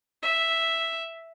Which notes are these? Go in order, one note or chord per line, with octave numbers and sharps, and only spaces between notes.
E5